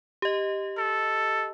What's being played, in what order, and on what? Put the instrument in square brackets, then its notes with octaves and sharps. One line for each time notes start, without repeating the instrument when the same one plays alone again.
[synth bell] G4 D#5
[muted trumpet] A4